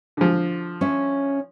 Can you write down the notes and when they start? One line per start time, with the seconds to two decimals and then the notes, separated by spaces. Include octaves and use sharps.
0.17 D3 F3
0.81 C#4 C#5 E5